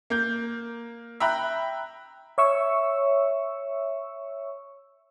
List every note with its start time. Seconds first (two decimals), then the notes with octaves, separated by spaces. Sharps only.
0.10 A#3 G6
1.20 E5 G5 A#5 B5 F#6
2.38 C#5 E5 C#6 E6